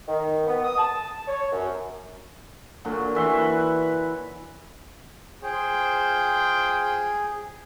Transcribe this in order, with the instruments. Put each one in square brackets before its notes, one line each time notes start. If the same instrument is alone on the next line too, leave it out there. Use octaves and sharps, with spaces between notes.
[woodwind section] D#3
B3
D#6
A5
C#5
F#2
[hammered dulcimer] A#2 D3 F#3
E3 E5 C6 C#6
B4
[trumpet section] F4 C5 G5 [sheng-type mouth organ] G#4